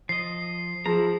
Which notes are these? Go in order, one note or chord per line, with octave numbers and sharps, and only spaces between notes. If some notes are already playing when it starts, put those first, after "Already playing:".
F3 D#5 C7
F3 E4 G#4 A#5